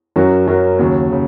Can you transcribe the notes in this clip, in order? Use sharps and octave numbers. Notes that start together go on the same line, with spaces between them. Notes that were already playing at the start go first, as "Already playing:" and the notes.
F#2 F#3 C#4 F#4 A#4
F#2 F#3 C#4 F#4 A#4
D#2 C#3 F#3
C#3